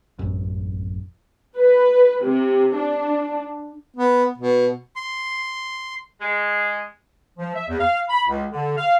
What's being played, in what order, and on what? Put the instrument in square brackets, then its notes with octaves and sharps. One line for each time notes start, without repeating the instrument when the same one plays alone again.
[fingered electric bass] E1 A1 F#2
[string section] B4
C3
D4
[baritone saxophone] B3
B2
[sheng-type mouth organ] C6
[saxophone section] G#3
[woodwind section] F3
E5
E2
F5
B5
C#2
D3
F5